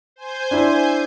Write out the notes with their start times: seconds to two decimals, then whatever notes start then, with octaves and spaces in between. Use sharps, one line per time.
0.16 C5 G#5 G6
0.51 D4 E4